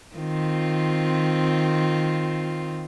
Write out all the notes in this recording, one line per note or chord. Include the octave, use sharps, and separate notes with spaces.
D#3 C4 F4